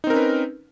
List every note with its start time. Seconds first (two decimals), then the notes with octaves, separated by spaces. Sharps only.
0.04 D#4
0.07 C4
0.10 A#4
0.13 C#4
0.16 B4